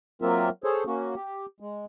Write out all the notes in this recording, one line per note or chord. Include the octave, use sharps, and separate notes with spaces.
F#3 A#3 C4 F4 A#4 E5
G#4 A4 C5 C#5
A#3 C#4 F#4
G4
G#3